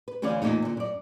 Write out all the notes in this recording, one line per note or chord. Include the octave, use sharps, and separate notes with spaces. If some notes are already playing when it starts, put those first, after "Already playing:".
B4
D2 E3 C#4 E4 D5 F5
E2 A#2 A3 D#4
A#2 D3
F#2 D5